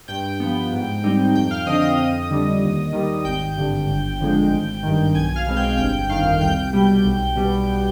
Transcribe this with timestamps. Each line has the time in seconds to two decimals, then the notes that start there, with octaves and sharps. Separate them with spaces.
0.08 G2 G5 G6
0.40 F3 B3
0.72 G#2
1.04 G3 C4 D#4
1.35 F2 G5 G6
1.51 F5 F6
1.66 D3 F3 C4 D#5 D#6
1.82 D#5 D#6
1.98 F2 D#5 D#6
2.30 D3 G3
2.62 D#2
2.93 D#3 G3
3.24 G#1 G5 G6
3.57 G2 D3
3.88 G1
4.20 F2 D3 F3 G#3
4.51 G#1
4.83 G2 D#3
5.15 B1 G#5 G#6
5.36 F5 F6
5.46 B2 G#3 C4
5.56 G5 G6
5.77 G1 G5 G6
6.09 F2 D#3 F5 F6
6.41 C2 G5 G6
6.73 B2 G3
7.04 B1
7.36 B2 G3 B3